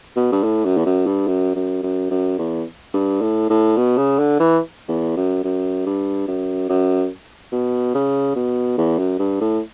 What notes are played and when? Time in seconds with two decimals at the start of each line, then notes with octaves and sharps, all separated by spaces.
0.16 B2
0.32 G2
0.43 A2
0.65 F#2
0.77 E2
0.85 F#2
1.06 G2
1.27 F#2
1.55 F#2
1.83 F#2
2.11 F#2
2.38 E2
2.94 G2
3.22 A2
3.50 A2
3.77 B2
3.97 C#3
4.19 D3
4.40 E3
4.88 E2
5.16 F#2
5.44 F#2
5.86 G2
6.28 F#2
6.69 F#2
7.52 B2
7.94 C#3
8.35 B2
8.77 E2
8.98 F#2
9.19 G2
9.41 A2